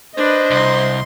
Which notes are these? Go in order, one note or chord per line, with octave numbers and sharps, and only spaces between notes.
D4 B4 C5 D#5
C2 C6